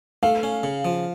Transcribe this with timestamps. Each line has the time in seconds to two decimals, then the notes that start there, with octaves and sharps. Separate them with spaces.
0.23 A3 F5
0.43 C#4
0.63 C#3
0.85 F3